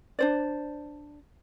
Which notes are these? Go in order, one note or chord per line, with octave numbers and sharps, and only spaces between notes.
D4 C5 D5